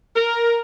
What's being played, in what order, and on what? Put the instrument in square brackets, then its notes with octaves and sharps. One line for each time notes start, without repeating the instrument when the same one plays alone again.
[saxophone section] A#4